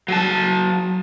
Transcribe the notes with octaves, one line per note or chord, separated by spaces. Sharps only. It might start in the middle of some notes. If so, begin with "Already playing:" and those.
F#3 A5